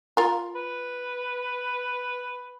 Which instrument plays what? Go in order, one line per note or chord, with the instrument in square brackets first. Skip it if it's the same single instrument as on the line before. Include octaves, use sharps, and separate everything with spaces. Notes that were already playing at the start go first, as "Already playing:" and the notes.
[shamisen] F4 A#4
[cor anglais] B4